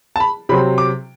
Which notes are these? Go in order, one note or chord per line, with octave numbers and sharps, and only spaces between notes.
A5
B5
C3 F#3 C4 B5
D6